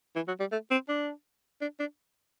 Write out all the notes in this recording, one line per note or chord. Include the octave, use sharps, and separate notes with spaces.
E3
F#3
G3
A3
C4
D4
D4
D4